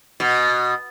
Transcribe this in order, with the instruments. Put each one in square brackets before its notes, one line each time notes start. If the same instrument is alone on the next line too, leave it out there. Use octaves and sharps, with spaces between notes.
[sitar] B2